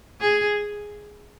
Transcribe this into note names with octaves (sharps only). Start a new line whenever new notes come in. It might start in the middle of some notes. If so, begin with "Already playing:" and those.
G#4